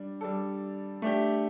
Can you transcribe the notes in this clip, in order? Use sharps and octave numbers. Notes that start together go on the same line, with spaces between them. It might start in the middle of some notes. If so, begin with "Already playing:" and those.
Already playing: G3 D4
G3 D4 A4
A3 D4 G4